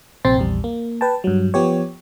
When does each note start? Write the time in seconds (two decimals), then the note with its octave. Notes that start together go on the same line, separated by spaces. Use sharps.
0.25 A#1 C3 C4 G5 C6 A6
0.38 A#1 E2 G3
0.64 A#3
1.01 B4 G5 A5
1.24 G2 F#3
1.54 F3 B3 G4 C#5